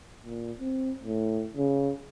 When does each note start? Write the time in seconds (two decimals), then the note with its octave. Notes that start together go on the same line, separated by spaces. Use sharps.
0.24 A#2
0.59 C4
1.03 A2
1.57 C#3